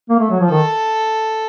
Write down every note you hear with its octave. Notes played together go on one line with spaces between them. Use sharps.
A#3
A3
F#3
F3
D#3 A4